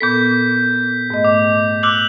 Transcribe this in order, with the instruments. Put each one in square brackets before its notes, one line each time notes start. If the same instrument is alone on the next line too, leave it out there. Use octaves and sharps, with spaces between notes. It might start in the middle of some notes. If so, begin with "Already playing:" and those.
[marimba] A#2 B3 A4 [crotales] G6 B6
[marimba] G#2 A3 D#5
[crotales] D6
[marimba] D6 [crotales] E6 F#6 F#7